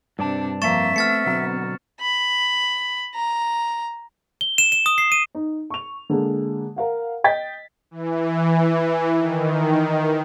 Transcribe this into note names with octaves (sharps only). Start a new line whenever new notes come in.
G2 C3 D4 D5 A5
F2 A#3 E5 C#6 A6 E7
A3 B3 C4 F6 A6 C#7
B2 D3 F#3
B5
A#5
G7
E7
E7
D#6
C7
D#7
D#4
C#6 F7
D3 G#3 A#3
A#4 F5 F#5
D#5 G5 A6 B6
E3
D#3